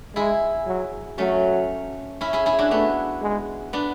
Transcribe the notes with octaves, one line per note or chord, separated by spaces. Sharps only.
G#3 E4 G#4
F#3
F#3 A3 C#4
C#4 E4
E4 G#4
E4 G#4
D4 F#4
A3 B3 D4
G#3
B3 D4